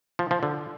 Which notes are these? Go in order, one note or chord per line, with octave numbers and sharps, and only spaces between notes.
F3
F3
D3